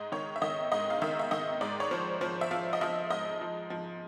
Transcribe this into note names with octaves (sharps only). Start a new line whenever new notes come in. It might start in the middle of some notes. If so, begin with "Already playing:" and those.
Already playing: G#2 D#5
D#3 C#5
E5
D#3 D#5
G#2 D#5
F5
D#3 E5
E5
D#3 D#5
G#2 D5
C#5
F3 C5
F3 C5
E5
F3 F5
D#5
F3 E5
G#2 D#5
F3
F3